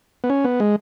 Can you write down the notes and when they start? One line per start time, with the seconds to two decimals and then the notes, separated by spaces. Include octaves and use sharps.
0.24 B3
0.30 C#4
0.44 B3
0.60 G#3